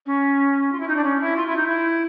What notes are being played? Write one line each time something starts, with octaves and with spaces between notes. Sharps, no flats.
C#4
F4
E4
D#4
D4
C#4
E4
F4
E4
D#4
E4